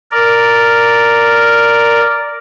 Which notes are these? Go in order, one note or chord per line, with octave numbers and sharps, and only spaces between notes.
A#4 D5